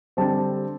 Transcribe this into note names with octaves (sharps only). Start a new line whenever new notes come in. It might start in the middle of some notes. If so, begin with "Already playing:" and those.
D3 G3 C4 A5